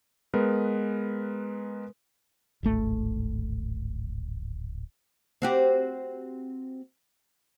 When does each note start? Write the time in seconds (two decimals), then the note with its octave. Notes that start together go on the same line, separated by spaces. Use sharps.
0.34 G#3 B3 A#4 B4
2.63 D1 G#1 A3
5.42 C4 F#4 G4